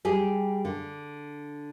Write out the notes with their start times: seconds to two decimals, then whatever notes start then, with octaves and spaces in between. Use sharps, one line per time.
0.05 G3 G4 G#4
0.65 D3